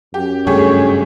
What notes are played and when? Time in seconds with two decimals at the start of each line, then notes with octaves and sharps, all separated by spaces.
0.14 F#2 G4
0.47 G2 C#3 A3 G4 G#4 C#5